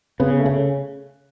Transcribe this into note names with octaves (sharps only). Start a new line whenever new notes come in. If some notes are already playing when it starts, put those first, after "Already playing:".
C#3 B3
A3
C#3